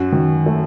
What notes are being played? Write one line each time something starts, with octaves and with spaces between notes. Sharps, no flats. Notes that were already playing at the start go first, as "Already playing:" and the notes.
Already playing: F#2 F#4
D#3
A3